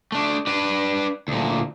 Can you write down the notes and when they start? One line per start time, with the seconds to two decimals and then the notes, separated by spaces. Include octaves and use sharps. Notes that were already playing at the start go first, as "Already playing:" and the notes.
0.12 A3 D4
0.47 D4 B4
1.28 D2 A#2